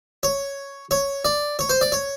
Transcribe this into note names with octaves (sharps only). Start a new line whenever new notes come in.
C#5
C#5
D5
C#5
C5
D5
C#5